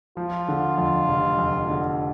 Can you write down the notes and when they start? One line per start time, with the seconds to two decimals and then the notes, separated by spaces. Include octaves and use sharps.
0.17 F3 F4
0.48 D3
0.78 F2
1.08 F1
1.38 F2
1.70 D3